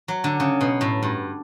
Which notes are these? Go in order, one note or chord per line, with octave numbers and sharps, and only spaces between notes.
F#3
D3
C#3
B2
A2
G2